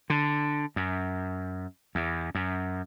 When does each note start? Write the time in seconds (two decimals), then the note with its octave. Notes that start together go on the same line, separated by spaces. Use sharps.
0.10 D3
0.76 F#2
1.95 E2
2.35 F#2